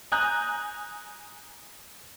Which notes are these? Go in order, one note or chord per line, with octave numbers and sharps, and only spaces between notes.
G#5 A#5 D#6 F#6 G6